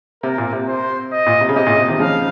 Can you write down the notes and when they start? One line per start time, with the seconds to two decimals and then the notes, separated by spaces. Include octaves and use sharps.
0.23 C3 A#4
0.38 A#2
0.52 C3
0.68 C5
1.12 D#5
1.26 A#2
1.41 C3
1.49 C#3
1.56 C3 D#5
1.67 A#2 C#3
1.78 C3
1.89 C3 D#3
1.99 C#3 F3 F5